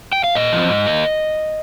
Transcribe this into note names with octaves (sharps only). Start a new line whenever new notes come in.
G5
F5
A#2 D#5
F3 C4
G#2
D#3 A#3 D#4